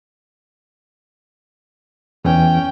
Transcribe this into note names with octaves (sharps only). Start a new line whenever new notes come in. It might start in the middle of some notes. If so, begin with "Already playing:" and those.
E2 E3 C#4 G5